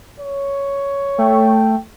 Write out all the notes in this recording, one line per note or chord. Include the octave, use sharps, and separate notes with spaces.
C#5
A3 G5